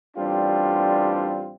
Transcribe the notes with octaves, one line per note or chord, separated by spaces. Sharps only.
A1 G3 C4 D4 F4